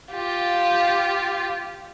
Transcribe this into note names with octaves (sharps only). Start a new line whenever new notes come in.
F4 G4